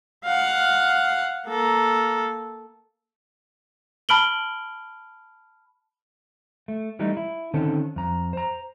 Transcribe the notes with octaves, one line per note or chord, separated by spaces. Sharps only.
F5 F#5
A#3 A4
A5 B5 F6 D7 F#7 G7
A3
E3 G3 A3 D#4
E4
D3 D#3 C4 C#4 A4
F2 A#5
C5 A#5